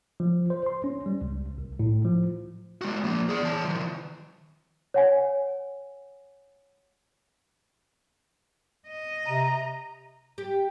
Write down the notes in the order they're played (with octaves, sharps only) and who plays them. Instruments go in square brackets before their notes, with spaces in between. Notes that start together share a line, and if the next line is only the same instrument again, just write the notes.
[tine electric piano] F3
C5
C6
C#4
G3
C#2
C2
A2
F3
[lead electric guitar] G#3 F#4
F3 A#3
G#4 D5
E3 A5
D#3 F3
[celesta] C#5 F#5 G#5
[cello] D#5
[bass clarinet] C3 [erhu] A#5
[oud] G4